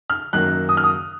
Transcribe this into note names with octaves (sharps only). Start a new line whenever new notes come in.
F6
F#2 D#3 F#3 A#3 F#6
D#6
F6
D#6